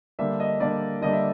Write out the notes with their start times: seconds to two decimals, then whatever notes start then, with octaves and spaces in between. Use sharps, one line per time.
0.19 D3 G3 A#3 D4 E5
0.40 D#5
0.60 D3 G3 A#3 D4 D5
1.01 D3 G3 A#3 D4 D#5
1.13 E5